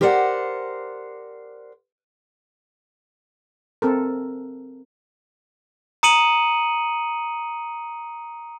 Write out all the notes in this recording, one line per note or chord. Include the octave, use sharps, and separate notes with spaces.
G4 A#4 C5 D5 E5 F#5
C4 A4 A#4
A#5 D#6 C#7 D#7 F#7